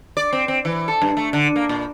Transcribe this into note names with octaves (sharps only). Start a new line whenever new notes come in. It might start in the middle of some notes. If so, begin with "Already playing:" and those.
D5
C4
C4
E3
A4
G2
A3
D3
A#3
A#2